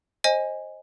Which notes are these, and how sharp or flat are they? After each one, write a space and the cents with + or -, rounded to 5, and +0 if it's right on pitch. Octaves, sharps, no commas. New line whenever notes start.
C5 +20 D#5 +0 G#5 -10